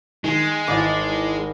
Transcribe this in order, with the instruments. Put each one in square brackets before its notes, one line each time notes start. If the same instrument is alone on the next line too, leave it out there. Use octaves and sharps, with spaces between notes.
[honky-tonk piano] D#3 [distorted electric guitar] G#3
[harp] G#1 A6 [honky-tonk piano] E3 D#5 D6